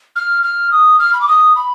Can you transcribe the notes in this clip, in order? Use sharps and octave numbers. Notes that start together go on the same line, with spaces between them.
F6
F6
D#6
F6
B5
D6
D#6
B5